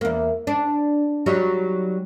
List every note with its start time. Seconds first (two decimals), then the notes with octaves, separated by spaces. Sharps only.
0.01 E2 A#3
0.47 D4
1.26 F#3 G3 D#4